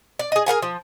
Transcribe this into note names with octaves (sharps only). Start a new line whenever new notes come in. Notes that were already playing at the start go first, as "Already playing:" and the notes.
D5
G#4 D#5
G#4 A#4 F#5 G#5
F3